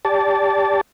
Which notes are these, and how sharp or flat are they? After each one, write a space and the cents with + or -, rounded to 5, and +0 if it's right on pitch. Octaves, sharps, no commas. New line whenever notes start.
G4 +20 D5 -25 A5 -5